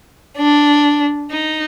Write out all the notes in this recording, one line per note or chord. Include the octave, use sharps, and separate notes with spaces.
D4
D#4